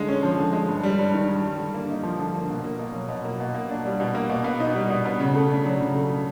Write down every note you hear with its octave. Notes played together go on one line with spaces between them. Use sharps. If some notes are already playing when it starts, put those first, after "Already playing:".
Already playing: D3 G#3
C#4
F3
D3
G#3
G2
G3
G2
D#3
G2
G3
D3
A#3
D#4
F3
D3
A#3
B2
A#3
B2
F#3
B2
A#3
B2
A#3
D4
G3
B2
A#3
B2
B3
D#4
G3
B2
B3
C#3
A3
D4
F#3
C#3
A3